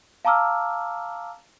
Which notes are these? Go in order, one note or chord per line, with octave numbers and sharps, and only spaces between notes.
F5 A5 A#5 D6 E6 F6